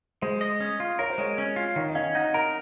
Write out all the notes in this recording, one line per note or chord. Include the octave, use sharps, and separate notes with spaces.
G#3 C5
D#5
C#4
F4
A#4 C#5
C5
G#3 C#5
C#4
F4
D#3 C#5
D#5
C#4 F5
D#4 F#5
A#4 A#5